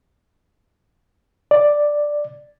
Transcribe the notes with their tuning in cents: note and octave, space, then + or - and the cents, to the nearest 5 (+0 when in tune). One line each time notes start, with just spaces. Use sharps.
D5 +5